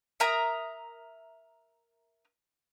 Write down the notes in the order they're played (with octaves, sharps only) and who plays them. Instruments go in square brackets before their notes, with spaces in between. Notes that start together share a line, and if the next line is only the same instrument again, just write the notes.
[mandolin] A#4 E5 A#5 D#6